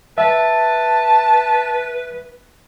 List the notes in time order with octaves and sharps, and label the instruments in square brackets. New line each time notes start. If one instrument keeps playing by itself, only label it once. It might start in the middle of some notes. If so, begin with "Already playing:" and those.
[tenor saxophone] B4 [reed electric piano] E5 [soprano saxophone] A5